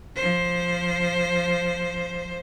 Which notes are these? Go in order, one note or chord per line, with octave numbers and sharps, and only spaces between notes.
F3 C5